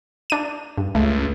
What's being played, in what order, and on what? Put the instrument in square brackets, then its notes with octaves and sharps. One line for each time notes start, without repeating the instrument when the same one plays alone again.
[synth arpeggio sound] D4 D#7
G2
[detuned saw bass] C#2 [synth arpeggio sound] A3